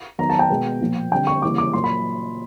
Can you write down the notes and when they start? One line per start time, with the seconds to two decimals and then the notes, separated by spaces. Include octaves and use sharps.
0.18 D#3 F#3 B3 A#5
0.30 A5
0.39 G5
0.50 B2 G#3 B3
0.81 A#2 F3 A#3
1.12 D3 G3 C4 G5
1.27 C#6
1.42 C#3 E3 G3 A#3 D6
1.58 D6
1.74 A#2 F#3 A#3 C6
1.84 B5